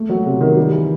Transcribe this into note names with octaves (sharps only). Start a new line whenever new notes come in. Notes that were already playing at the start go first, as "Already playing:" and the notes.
Already playing: A3
F#3
C3
D#3
G3
E3